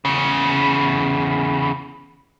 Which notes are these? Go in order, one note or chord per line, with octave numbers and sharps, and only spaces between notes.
E2 C#3